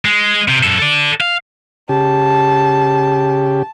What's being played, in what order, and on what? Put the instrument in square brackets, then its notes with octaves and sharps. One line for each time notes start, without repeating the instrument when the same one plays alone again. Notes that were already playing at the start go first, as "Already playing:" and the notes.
[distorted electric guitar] G#3
C3
F#2 A4
A4 D5
F5
[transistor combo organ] C#3 G4 [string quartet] A5